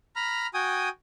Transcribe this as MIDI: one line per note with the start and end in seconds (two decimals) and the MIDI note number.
0.16 0.47 82
0.16 0.47 83
0.16 0.47 89
0.54 0.89 66
0.54 0.89 79
0.54 0.89 80
0.54 0.89 87